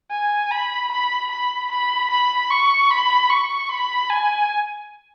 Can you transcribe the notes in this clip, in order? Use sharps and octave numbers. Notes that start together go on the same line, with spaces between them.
G#5
B5
B5
B5
B5
B5
C#6
B5
C#6
B5
G#5